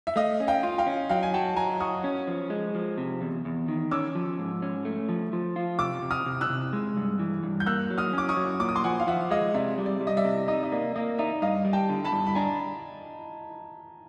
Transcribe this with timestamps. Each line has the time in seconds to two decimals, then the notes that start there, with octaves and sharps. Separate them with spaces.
0.07 E5
0.16 A3 D#5 F5
0.40 C#4
0.48 F5 G5
0.63 F4
0.78 F5 G5
0.87 C#4
1.09 F#3 F5 G5
1.23 G#5
1.34 F#4 G5 A5
1.56 F#3 G#5 A#5
1.80 F#4 C#6 D#6
2.04 C#4
2.27 F3
2.50 G#3
2.75 F3
2.98 C3
3.21 E2
3.45 E2
3.68 D#3
3.91 C#4 D6 E6
4.15 F3
4.39 G#2
4.62 C#4
4.85 A3
5.09 F3
5.33 F3
5.56 F4
5.78 C3 D6 E6
6.02 C3
6.11 D#6 F6
6.26 C3
6.41 E6 F#6
6.50 C3
6.73 G#3
6.97 G2
7.19 E3
7.43 G2
7.60 G6
7.66 A#3 E6 F#6
7.90 F#3
7.98 D#6 F6
8.13 C#4 D6
8.29 C#6 D#6
8.36 F#3
8.60 A#2 D6
8.69 D#6
8.76 C6 D6
8.84 F3 F#5 G#5
9.00 F5
9.07 F3 E5 F#5
9.31 G#3 D#5 F5
9.54 C3 D5 E5
9.78 G3
9.86 D5
10.01 G3
10.07 D#5
10.17 D5 E5
10.25 C3
10.48 D#4 D#5
10.63 D#5
10.72 A#3 D5
10.96 A#3 D#5
11.18 D#4 D5 E5
11.42 G2 D#5 F5
11.65 G3
11.73 G5 A5
11.89 D3
12.04 A5 B5
12.12 G2
12.27 B5
12.35 D4 G#5 A#5